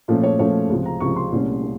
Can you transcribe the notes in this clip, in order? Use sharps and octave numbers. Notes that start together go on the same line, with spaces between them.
A#2 F3 A3 C#4
C#5
A#2 F3 A3 C#4 C#5
C#2 C3 F3
A#5
C#2 C3 F3 C#6
C6
C2 A#2 A3 C#4
C#4